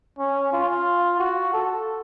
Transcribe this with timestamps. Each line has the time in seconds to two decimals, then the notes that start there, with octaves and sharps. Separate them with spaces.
0.19 C#4
0.53 F4
1.20 F#4
1.54 A4